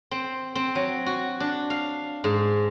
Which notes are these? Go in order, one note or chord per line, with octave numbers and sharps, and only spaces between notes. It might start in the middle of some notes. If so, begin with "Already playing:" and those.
C4
C4
F#3
F#4
D4
F5
G#2